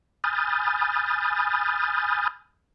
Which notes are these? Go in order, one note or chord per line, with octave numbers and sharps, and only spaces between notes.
G#5 B5 D#6 F6 G6 A6